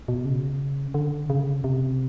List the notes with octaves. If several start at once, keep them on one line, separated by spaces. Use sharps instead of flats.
B2
C#3
D3
C#3
C3